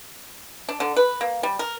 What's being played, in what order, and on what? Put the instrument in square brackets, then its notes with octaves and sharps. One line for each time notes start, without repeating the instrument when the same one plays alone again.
[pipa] D4
D3
B4
A#3
G3
A#4